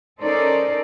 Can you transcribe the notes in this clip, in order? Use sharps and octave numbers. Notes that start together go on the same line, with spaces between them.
C#4 D#4 A4 A#4 C5 D5